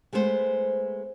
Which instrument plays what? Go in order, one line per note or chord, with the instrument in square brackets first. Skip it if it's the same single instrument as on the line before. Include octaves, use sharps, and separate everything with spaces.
[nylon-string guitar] G#3 A3 B3 A4 C5